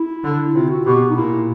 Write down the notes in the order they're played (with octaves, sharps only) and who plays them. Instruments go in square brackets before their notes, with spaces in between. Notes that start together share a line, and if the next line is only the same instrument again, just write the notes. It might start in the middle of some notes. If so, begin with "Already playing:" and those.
Already playing: [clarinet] E4
[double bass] D3
[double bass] C3 [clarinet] F4
[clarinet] F#4
[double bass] B2 [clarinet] G4
[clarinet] D#4
[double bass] A#2 [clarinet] E4